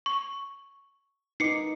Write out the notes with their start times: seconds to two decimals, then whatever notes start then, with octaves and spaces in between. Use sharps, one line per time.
0.06 C#6
1.40 D#4 B4 D6 C7 C#7